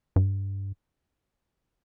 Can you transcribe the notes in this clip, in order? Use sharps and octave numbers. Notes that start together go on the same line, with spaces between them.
G2